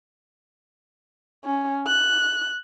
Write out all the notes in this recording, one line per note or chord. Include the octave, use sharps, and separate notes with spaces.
C#4
F#6